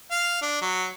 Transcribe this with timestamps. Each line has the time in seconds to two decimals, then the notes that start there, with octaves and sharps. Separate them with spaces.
0.11 F5
0.42 D4
0.62 F#3